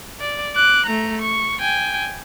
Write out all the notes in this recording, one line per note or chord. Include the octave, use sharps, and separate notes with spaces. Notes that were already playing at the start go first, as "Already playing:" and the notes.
D5
D6 F#6
A3 A#5
C#6
G5 G#5